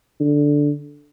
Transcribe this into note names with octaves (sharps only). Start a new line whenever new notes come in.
D3